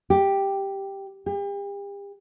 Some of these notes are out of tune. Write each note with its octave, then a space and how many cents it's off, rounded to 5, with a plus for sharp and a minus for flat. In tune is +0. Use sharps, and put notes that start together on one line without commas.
G4 +0
G4 +40